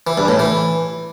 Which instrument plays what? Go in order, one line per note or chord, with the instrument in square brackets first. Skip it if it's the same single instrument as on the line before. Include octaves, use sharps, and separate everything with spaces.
[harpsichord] E3
G2
A2
E3